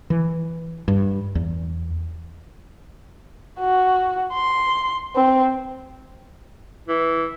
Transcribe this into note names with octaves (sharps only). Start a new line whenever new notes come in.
E3
G2
E2
F#4
C6
C4
E3